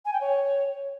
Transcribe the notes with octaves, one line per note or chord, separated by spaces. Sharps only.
G#5
G5
C#5